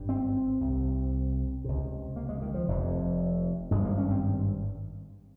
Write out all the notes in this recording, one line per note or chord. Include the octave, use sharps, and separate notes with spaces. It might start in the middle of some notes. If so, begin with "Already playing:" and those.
Already playing: G#1 G2
C4
C2 C3
C#2 C3
A#3
G#3
D#3
F3
F1 F2 C3
G#1 G2 G#3
A#3
C#4
C4